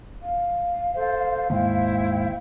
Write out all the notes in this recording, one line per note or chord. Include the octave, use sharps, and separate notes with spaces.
F5
A4 C5
D#2 G#2 E4 C5 G5